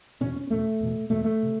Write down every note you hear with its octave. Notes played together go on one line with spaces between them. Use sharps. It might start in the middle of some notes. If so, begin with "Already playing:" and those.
E2 B2 C#4
C#4
E2 B2 A3
E2 B2
E2 B2 A3
A3
C3